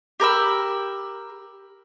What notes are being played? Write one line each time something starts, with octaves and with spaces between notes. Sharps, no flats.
G4 A#4 B5 E6